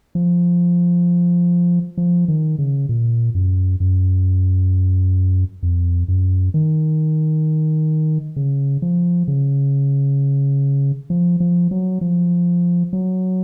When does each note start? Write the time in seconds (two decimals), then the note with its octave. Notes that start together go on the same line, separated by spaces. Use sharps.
0.15 F3
1.98 F3
2.28 D#3
2.58 C#3
2.89 A#2
3.35 F#2
3.80 F#2
5.63 F2
6.08 F#2
6.54 D#3
8.36 C#3
8.82 F3
9.28 C#3
11.10 F3
11.40 F3
11.71 F#3
12.01 F3
12.93 F#3